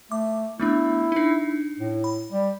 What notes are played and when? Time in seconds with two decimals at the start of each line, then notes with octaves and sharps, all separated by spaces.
0.12 A3 D6
0.60 A3 B3 D4 E4
1.12 D4 D#4
1.79 A2
2.04 B5
2.32 G3